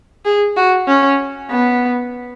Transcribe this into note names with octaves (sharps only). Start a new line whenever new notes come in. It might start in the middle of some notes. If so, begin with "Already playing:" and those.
G#4
F#4
C#4
B3